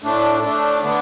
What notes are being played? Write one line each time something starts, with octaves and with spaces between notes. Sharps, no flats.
A2 A3 D4
A2 A3 D4
D3 B3 D4